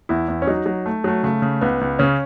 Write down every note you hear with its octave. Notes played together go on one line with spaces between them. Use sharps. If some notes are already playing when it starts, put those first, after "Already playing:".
E2 E4
E2
C#4
F#3 D#4
F#3
A3
F#3 A3
C#3 A3
C#3
C#2 B3
C#2
C#3 C#4